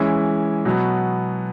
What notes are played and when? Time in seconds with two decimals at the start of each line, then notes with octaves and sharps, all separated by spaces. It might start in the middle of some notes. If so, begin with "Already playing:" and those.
Already playing: E3 G#3 C#4 E4
0.65 B2 F#3 B3